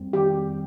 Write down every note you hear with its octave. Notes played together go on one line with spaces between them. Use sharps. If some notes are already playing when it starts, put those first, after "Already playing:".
Already playing: F2 G3 C4
D#3 G4 G5